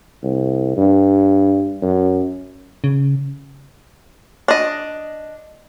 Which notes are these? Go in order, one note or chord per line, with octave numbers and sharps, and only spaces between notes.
C2
G2
F#2
C#3
D4 D#5